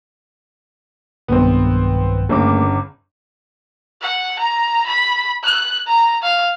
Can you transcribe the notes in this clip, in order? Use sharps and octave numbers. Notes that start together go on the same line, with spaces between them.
B1 G2 D#3 B3 C4
G1 C#3 A3 A#3 A#4 D6
F#5
A#5
B5
F#6
A#5
F5